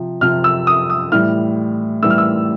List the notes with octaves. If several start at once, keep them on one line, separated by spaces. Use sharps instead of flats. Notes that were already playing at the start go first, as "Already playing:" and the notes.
Already playing: C3 F3
C3 F3 F6
E6
D#6
D#6
A2 E3 G3 F6
A2 E3 G3 E6
F6
E6